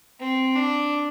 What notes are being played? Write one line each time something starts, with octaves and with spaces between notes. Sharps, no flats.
C4
D4